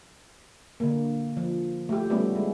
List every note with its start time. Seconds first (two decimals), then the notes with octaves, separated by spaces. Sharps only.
0.80 D3 A#3
1.37 F3
1.89 A3 G4
2.10 G3 A3 B3 C#4 G4
2.35 G#3